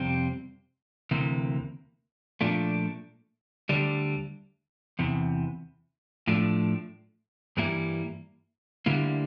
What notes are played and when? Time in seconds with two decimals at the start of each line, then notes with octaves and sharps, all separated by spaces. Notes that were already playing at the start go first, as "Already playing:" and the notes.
Already playing: F2 C3 G3 C4
1.11 D2 C3 E3 A#3
2.41 A#2 F3 A3 D4
3.69 D2 D3 G3 D4
4.99 E2 C3 E3
6.27 A2 F3 A3 D4
7.57 G2 E3 G3 A#3 E4
8.86 D2 D3 G3 A#3 E4